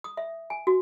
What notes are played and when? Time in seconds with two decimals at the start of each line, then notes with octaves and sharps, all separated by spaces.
0.04 D#6
0.17 E5
0.50 G#5
0.67 F#4